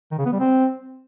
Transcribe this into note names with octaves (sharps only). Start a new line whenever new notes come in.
D#3
C#3
B3
G3
C4